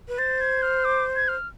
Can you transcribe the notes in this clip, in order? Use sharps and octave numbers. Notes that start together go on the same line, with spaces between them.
B4
C5 A6
G#6
F6
D6
G#6
F6